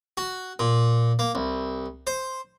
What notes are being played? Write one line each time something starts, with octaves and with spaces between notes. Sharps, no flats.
F#4
A#2
A#3
C2
C5